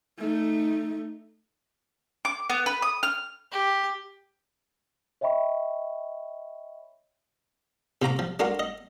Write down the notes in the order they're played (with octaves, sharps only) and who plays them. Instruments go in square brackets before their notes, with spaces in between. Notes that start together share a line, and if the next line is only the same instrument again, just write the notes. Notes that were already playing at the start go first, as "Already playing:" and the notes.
[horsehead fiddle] A3 D#4
[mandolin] D6
B3
B4
D#6
F6
[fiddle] G4
[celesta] C#5 D#5 E5 G5 B5 C#6
[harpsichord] C3 F4 A#5 D6
F3
D4 F4 F#4 A#4
D#5